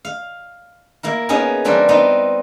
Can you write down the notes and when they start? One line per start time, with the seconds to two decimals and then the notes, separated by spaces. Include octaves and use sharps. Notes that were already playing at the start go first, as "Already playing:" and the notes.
0.05 F5
1.03 A#3 E4 A#4
1.29 A#3 B3 C#4 D#4 G#4 A#4
1.65 E3 G3 A#3 C4 D4 F#4
1.89 B3 C4 D#4